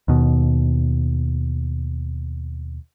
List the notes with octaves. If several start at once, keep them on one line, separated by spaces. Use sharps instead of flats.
D#2 B2